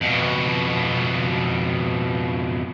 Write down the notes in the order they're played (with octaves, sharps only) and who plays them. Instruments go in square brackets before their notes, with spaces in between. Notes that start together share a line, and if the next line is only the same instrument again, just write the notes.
[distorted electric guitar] F2 B2